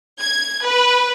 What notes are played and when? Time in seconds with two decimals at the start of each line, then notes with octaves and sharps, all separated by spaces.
0.20 G#6
0.64 B4